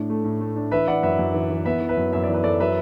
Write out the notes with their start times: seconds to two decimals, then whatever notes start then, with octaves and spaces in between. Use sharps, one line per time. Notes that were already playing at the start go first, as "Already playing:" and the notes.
Already playing: A2 D4
0.10 A3
0.24 A2
0.41 A3
0.56 D4
0.71 E3 B4 E5
0.87 E3 D5 F#5
1.03 F#2 B4 E5
1.19 F#2
1.34 E3
1.50 E3
1.65 B3 B4 E5
1.81 E3
1.89 B4 E5
1.97 F#2
2.13 F#2 E5
2.23 E3 D5
2.34 B4
2.43 F#2 A4 D5
2.60 F#3 B4 E5